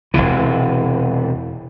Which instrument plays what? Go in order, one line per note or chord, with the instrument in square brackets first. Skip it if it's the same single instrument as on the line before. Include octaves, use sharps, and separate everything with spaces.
[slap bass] E1 B1 C3 E3